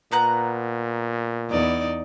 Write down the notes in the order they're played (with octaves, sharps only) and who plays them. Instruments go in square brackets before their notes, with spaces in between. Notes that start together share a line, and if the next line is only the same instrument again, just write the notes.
[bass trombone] A#2 [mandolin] B3 A#5 F#6
[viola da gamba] E2 D#4 D5